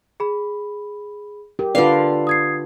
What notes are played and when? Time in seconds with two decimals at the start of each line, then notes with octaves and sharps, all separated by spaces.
0.20 G#4 B5
1.59 G4 A#4
1.75 D3 F4 B4 D5 F5
2.27 D#6 G#6 C7